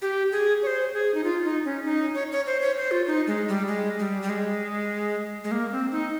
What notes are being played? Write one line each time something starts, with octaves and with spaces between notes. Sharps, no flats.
G4
G#4
C#5
C5
G#4
D#4
F4
D#4
C#4
D#4
C#5
C#5
C5
C#5
C5
F4
D#4
G#3
G3
G#3
G3
G3
G#3
G#3
A#3
C4
D#4